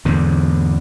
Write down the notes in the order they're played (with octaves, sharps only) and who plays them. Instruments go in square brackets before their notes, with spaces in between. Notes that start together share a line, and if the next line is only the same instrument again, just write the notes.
[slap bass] E2 G#2 D3